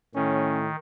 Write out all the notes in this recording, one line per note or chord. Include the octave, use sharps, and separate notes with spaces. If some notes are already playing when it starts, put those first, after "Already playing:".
A2 D#3 C#4